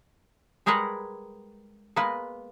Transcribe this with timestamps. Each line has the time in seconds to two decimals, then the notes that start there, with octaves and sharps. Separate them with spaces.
0.66 G3 G#3 G#4 A#4 B4 F#5
1.96 G#3 A#3 B3 B4